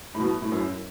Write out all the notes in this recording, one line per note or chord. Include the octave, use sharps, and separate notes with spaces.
A2
B2
A2
F#2